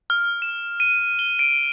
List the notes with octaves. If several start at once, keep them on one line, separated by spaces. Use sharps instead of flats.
F6
E7
D#7
G7
D7